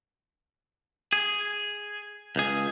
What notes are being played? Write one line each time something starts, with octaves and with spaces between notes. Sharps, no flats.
G#4
C#2 G#4